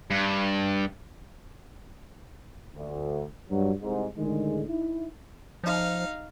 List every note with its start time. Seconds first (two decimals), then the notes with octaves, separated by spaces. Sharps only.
0.10 G2
2.76 D2
3.50 G2 F#3
3.82 C2 G#2
4.17 A2 D3 D#3 G#3
4.69 D#4 E4
5.64 F3 D#4 F5